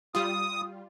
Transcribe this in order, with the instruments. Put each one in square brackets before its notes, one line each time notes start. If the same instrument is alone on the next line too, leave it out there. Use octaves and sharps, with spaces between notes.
[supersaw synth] G3 F4 [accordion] D#6